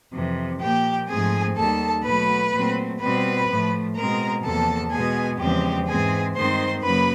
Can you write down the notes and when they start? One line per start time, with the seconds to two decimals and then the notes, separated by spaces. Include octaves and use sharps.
0.13 F2 C3 E3
0.61 A#2 F3 A#3 G4 G5
1.08 G#2 F3 A3 C4 G#4 G#5
1.57 D#2 D#3 G3 A4 A5
2.04 B2 F#3 A3 B4 B5
2.52 A#2 F#3 A3 C4
3.00 B2 G3 C4 B4 B5
3.48 A2 F3 A3
3.96 B2 G#3 C4 A#4 A#5
4.44 E2 C3 F3 A#3 A4 A5
4.92 B2 G#3 B3 G#4 G#5
5.40 E2 C#3 F3 G#3 C4 G4 G5
5.87 G#2 E3 G#3 C4 G#4 G#5
6.36 G2 D#3 G#3 C4 C5 C6
6.83 F#2 C#3 F#3 A#3 B4 B5